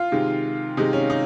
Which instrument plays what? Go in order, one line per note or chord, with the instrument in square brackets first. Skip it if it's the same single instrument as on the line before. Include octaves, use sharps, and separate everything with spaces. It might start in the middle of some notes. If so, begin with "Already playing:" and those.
Already playing: [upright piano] F4
C3 D#3 G#3
C3 D#3 G#3 D#4
C#4
D#4